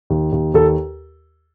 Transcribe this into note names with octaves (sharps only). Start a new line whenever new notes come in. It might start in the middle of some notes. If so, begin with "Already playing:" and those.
D#2
D#2
D#2 A4